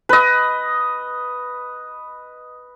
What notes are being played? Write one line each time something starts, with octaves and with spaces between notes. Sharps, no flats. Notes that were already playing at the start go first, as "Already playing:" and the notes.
B4 D#5